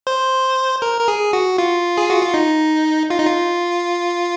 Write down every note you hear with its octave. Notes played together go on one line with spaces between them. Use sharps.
C5
A#4
A#4
G#4
F#4
F4
G#4
F#4
F4
D#4
F4
D#4
F4